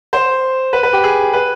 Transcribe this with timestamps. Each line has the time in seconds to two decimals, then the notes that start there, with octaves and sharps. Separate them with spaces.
0.13 C5
0.73 B4
0.83 B4
0.93 G4
1.04 G#4
1.33 B4